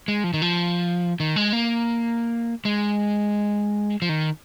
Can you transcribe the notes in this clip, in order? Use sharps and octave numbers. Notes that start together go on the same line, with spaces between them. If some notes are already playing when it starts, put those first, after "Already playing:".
G#3
F3
D#3
F3
D#3
G#3
A#3
G#3
F3
D#3